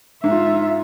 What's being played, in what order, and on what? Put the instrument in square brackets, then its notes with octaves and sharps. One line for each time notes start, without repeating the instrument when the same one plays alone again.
[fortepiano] G#2 [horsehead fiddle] F4 E5